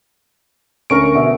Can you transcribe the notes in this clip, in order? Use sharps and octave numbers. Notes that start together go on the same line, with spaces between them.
D2 C#4 A#4 C#6 D7
B2 E5